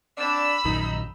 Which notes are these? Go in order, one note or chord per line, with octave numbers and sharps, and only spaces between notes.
C4 D4 B5 E6
A#1 F#2 D#3 D#4